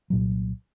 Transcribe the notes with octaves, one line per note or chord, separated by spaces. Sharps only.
C2 A#2 F#3